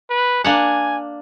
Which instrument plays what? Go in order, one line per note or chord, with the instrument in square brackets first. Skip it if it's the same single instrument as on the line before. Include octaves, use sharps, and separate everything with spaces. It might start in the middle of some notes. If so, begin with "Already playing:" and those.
[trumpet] B4
[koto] A#3 D4 F#5 [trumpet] G#5